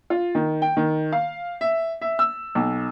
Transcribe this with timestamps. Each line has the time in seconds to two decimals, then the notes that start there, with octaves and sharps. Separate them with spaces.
0.10 F4
0.35 D#3
0.62 G5
0.77 D#3
1.12 F5
1.61 E5
2.02 E5
2.19 E6
2.55 B1